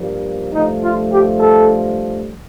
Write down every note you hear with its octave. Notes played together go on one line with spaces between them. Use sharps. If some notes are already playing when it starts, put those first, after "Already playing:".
Already playing: G2 F3 A#3
G2 F3 A3 D#4
F4
G4
A4